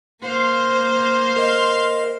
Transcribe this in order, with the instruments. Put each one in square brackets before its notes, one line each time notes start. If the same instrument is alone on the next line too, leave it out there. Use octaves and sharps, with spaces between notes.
[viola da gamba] A#3 C5 [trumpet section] F5 C6
[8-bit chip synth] A#4 D#5